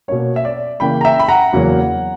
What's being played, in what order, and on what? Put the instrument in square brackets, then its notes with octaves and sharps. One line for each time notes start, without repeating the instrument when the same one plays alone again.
[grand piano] B2 A#3 C#4 C#5
E5
D5
C#3 E3 A#3 G5 B5
A#5
E5 G5
B5
F#5 A#5
E2 C#3 F#3 A#3 C#4